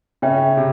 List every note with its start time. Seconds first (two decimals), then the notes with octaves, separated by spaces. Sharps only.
0.22 C#3 C#4 C#5 E5 G5
0.57 C3